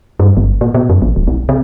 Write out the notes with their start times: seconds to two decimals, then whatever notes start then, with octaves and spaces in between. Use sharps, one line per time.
0.20 G2
0.37 G1
0.61 A#2
0.74 B2
0.89 F#2
1.02 A1
1.16 D#1
1.27 B1
1.49 C3